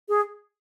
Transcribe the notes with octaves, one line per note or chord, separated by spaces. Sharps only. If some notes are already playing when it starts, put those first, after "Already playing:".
G#4